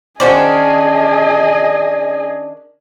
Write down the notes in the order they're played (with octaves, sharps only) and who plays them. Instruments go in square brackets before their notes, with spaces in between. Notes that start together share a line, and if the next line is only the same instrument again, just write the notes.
[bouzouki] D#3 C#4 D4 [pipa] F#4 C5 D5 [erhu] G#4 [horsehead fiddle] D#5